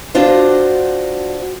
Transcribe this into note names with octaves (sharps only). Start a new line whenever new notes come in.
D4 F4 F#4 C5